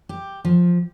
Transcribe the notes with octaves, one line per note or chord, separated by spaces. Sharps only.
G4
F3